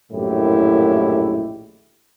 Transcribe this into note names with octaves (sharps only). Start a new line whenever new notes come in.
A#1 F#2 A2 D#3 E4 G4